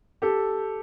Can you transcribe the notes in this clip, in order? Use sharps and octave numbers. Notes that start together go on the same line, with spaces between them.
G4 A4